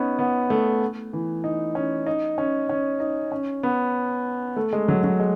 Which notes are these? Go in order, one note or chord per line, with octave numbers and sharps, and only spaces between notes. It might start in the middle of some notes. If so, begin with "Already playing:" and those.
Already playing: B3 C#4 D#4
B3
A3
E3
D#4
C#4
D#4
C#4
C#4
D#4
C#4
B3
A3
G#3
F#3
F#3
G#3